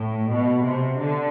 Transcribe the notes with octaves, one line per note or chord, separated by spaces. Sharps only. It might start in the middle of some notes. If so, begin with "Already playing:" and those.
Already playing: A2
B2
C3
D3